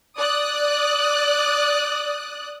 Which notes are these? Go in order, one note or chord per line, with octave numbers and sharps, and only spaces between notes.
D5 D#6 F#6